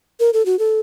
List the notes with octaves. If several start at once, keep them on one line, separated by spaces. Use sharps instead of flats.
A#4
A4
F#4
A4